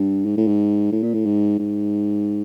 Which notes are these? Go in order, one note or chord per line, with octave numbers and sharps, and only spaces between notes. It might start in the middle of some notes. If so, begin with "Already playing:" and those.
Already playing: G2
G#2
A2
G#2
A2
A#2
A2
G#2
G#2